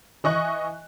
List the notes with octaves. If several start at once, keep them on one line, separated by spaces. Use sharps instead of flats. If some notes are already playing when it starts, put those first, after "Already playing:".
E3 D#5 C#6 F#6